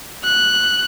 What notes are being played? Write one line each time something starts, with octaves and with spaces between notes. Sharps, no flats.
F#6